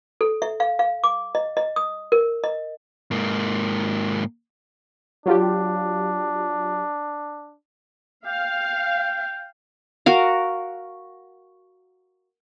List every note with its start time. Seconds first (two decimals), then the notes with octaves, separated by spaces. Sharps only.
0.21 A4
0.42 E5
0.60 F5
0.79 F5
1.04 D6
1.35 D#5
1.57 D#5
1.76 D#6
2.12 A#4
2.44 D#5
3.11 G#2 A#3
5.26 F#3 D4 F4 G4
8.26 F5 G5
10.06 F#4 A#4 F5